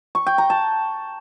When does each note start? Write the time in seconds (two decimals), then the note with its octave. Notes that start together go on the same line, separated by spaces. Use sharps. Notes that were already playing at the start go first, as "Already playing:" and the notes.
0.15 C#6
0.27 G5
0.38 A#5
0.50 A5